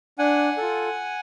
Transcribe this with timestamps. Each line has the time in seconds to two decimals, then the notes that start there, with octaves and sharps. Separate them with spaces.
0.19 D4 F#5 G#5
0.57 F4 A4